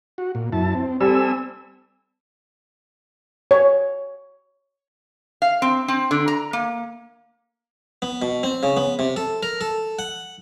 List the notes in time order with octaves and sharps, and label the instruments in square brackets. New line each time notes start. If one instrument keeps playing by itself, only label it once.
[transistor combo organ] F#4
A#2
F#2 E4 A5
C4
[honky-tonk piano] G3 A4 [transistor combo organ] C4 G#5 E6
[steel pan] C#5
[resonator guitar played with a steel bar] F5
C4
C4
D3
A#5
A#3
[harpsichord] B3
B2
C4
C#3
B3
C3
A4
A#4
A4
F#5